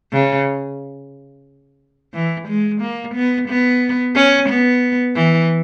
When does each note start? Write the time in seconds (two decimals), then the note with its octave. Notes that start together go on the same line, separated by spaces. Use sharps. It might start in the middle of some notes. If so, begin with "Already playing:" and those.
0.13 C#3
2.14 E3
2.48 G#3
2.81 A#3
3.15 B3
3.48 B3
4.15 C#4
4.49 B3
5.16 E3